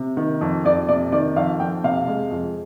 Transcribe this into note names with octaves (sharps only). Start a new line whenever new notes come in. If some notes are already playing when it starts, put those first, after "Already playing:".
Already playing: C3
D#3
F2
F2 D5
C3 D5
D#3 D5
F2 F5
F2 G5
C3 F5
G#3
F2